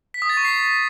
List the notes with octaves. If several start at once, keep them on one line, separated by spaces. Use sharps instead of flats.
B6
D#6
A6
C#6
C7